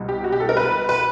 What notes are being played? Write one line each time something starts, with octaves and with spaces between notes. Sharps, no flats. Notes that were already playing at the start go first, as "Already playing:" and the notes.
Already playing: C2 B2 G3
G4
F#4
G4
A4
A#4
B4
B4